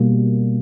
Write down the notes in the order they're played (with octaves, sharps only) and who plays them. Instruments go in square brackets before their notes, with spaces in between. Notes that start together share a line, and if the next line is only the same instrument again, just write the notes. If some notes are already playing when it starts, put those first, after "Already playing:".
Already playing: [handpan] B2 G3 A#3